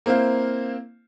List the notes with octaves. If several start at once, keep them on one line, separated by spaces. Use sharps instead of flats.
A#3 C4 E4 C5 F5